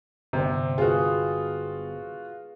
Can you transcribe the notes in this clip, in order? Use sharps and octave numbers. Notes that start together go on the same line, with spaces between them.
G1 C3 C4 C5
F4 F#4 G#4 B4